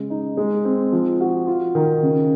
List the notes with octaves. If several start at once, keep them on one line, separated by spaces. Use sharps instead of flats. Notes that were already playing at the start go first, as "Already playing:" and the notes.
Already playing: C#3 G#3
D#4
G#3
C4
F3
F#4
F4
D#3
C#3